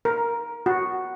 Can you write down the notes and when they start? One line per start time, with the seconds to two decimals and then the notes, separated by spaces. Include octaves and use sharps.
0.05 A#4
0.66 F#4